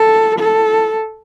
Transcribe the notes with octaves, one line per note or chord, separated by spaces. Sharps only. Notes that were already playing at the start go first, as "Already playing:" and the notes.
Already playing: A4
A4